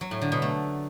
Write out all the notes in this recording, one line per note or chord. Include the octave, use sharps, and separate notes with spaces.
F#3
A2
D3
B2
A3